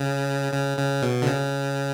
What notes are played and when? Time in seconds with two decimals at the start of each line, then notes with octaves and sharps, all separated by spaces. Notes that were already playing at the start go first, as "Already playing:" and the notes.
Already playing: C#3
0.53 C#3
0.78 C#3
1.02 B2
1.22 D3
1.27 C#3